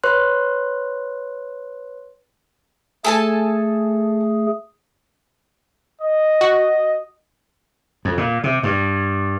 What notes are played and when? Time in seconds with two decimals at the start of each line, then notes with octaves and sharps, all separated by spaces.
0.04 B4 C#5 C6 F#6
3.05 A3 G#4 A4 G#5 A5
6.01 D#5
6.41 F#4
8.05 F2
8.17 A#2
8.44 C3
8.63 G2